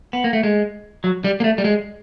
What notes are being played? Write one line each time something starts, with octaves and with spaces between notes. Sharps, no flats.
B3
A#3
A3
G#3
F#3
G3
A#3
A3
G3
G#3